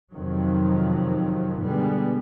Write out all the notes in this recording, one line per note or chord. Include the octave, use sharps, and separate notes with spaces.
F2 C3 D#3 F3 F#3
B2 D3 G3 G#3 B3